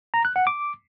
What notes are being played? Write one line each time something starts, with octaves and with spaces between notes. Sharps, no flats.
A#5
F#6
F#5
D6